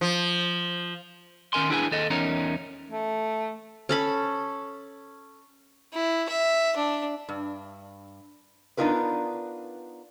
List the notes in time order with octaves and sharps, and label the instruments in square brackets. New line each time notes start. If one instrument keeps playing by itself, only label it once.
[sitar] F3
[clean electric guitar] D#3 C#4 A#4 G#5 C6
D4 E4 G#4 B4 F5 G#5
D#2 A4 D#5
E2 C#4 D#4 A#4
[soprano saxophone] A3
[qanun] C#4 A4 B5
[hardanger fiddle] E4
E5
D4
[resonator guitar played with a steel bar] G2
B3 D4 D#4 F4 A#4 B4